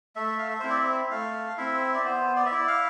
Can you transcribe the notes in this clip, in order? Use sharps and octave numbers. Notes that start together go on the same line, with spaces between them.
A3 E5
F5
E5
C4 E4 C5
D5
E5
A3 F5
C4 E4 E5
D5
B3 C5
D5
E5
E4 D5
F5